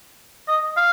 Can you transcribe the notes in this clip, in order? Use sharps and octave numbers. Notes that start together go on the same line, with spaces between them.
D#5
F5